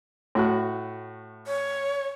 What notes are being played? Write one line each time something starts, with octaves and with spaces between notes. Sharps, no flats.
A2 F#4 F#6
C#5